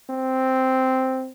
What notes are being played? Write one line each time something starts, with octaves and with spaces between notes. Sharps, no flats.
C4